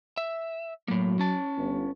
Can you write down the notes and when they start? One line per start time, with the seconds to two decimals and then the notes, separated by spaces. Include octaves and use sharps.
0.17 E5
0.88 A2 F#3 A#3
1.19 C#4 A5
1.57 G1